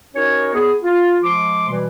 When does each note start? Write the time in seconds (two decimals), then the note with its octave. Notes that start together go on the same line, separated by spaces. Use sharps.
0.15 C#4 D#4 F#4 A#4 C#5
0.54 B3 G#4
0.83 F4
1.23 F3 G#3 C6 D6
1.68 B2 E3 G3